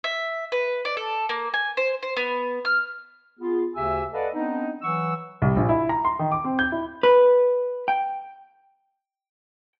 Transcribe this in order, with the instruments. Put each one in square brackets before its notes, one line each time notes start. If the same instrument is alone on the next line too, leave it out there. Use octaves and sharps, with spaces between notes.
[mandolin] E5
B4
D5
A4
A#3
G#5
C5
C5
B3
F6
[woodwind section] B3 F4 G#4
D2 C#3 G4 E5 G#5 E6
A4 B4 D5 D#5 F5 F#5
B3 C4 D4 D#4
E3 F#3 F#5 C#6 E6
[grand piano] C2
A#1
E4
A#5
C6
D#3
D6
C4
G6
E4
[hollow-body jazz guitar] B4
G5